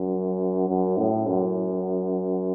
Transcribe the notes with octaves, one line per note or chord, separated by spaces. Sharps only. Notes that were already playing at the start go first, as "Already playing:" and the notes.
Already playing: F#2
F#2
A2
F#2